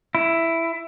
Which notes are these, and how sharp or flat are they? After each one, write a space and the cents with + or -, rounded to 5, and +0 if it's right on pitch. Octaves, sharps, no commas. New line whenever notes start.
E4 +5